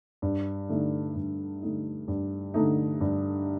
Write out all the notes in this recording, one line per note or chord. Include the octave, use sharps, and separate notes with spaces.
G2
D3 A3 D#4
G2
D3 A3 D#4
G2
D3 A3 D#4
G2